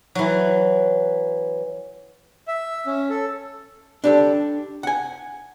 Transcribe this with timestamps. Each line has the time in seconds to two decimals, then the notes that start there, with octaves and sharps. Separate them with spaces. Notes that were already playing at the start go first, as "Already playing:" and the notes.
0.15 E3 F#3
2.48 E5
2.86 C#4
3.10 A4
4.04 D4 G4 A4
4.83 F#5 G#5